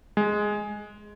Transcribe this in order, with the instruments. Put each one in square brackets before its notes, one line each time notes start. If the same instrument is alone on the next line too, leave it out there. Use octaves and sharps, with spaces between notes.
[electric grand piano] G#3